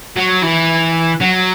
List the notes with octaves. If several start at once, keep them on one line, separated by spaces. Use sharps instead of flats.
F#3
E3
F#3